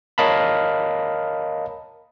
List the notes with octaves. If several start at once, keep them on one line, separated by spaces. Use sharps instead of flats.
A#4 C#5 D#5 F5 A5 B5